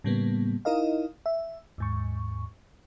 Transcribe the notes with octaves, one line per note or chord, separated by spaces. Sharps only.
A2 C#3 G3 A#3 B3
D#4 E4 A#4 D#5 F5
E5
D#2 G#2 C#6